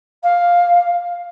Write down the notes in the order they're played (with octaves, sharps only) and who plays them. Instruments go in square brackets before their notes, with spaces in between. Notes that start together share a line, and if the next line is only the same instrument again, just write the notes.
[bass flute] F5